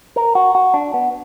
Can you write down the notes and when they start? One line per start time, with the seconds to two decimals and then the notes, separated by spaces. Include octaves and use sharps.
0.16 A#4
0.35 F#4
0.55 F#4
0.74 D4
0.94 B3